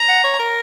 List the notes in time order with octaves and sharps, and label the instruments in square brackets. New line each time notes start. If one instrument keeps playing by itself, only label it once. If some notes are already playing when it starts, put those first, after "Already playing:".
Already playing: [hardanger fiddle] A#5
[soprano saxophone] F#5
C#5
A#4